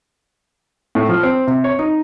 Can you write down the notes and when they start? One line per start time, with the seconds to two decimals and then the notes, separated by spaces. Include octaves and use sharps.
0.95 A2
1.09 F3
1.23 C4
1.47 C3
1.64 C#5
1.79 D#4